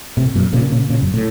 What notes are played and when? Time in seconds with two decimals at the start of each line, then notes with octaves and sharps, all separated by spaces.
0.17 A2 C3
0.35 F#2 A#2
0.53 A#2 C#3
0.71 A#2 C#3
0.89 A#2 C#3
1.02 F#2
1.14 A2